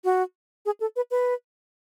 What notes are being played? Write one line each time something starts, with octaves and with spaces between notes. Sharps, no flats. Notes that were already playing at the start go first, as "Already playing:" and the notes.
F#4
G#4
A4
B4
B4